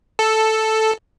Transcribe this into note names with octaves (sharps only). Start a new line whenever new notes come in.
A4